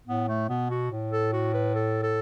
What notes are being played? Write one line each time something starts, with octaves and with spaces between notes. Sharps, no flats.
A2 B3
A3
B2 B3
F#4
A2
A4
F#4
B4
A4
A4